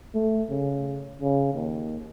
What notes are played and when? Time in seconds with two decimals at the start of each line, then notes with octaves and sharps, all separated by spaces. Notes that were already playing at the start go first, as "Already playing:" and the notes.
0.15 A3
0.50 C#3
1.22 C#3
1.54 D#2